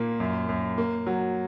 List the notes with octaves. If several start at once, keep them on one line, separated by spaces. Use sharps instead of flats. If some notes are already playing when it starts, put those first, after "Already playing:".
Already playing: A#2 A#3
F#2
F#2
A#3
F#3